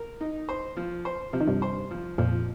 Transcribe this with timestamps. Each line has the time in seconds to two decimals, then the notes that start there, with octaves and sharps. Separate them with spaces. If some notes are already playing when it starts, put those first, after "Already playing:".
Already playing: A#4
0.21 D#4
0.49 C5
0.77 F3
1.05 C5
1.33 C3 F3
1.41 D#3
1.47 G2 C3
1.62 C5
1.91 F3
2.18 F2 A#2 F3